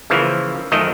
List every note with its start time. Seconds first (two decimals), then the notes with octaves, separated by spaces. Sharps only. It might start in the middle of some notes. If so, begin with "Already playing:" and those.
0.10 C#3 E3 F3 A#3
0.72 F#2 D#3 F3 A3 A#4 D#5